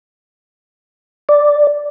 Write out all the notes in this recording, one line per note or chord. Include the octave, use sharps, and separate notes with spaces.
D5